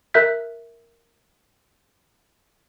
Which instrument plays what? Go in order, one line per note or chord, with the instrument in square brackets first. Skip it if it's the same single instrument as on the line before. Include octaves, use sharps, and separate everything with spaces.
[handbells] A#4 E5 F#6 G6 B6